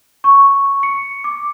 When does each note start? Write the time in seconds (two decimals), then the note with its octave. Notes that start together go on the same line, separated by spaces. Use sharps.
0.24 C#6
0.83 C#7
1.24 D6